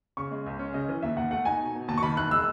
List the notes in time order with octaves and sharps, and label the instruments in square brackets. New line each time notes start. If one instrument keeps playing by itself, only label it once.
[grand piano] C#3 [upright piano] C#6
[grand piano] G#3
C#2
C#4
[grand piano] C#3 [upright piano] D#5
[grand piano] E3
[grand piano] D#2 [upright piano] E5
[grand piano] D#2 [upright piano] F#5
[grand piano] A3 [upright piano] F#5
[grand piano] D#4 [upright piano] G#5
[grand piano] B2
B2
[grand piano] D#2 [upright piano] A5
[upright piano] C#6
[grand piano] D#3 [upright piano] B5
[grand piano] E1 [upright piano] F#6
[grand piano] G#3 [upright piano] E6